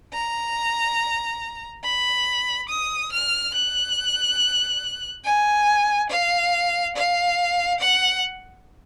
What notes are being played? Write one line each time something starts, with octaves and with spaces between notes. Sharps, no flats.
A#5
B5
D#6
F6
F#6
G#5
F5
F5
F#5